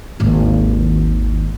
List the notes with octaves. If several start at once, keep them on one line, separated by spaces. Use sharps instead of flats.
G#1 D#2